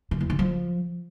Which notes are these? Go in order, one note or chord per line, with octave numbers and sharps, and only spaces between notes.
D3
E2
D3
F3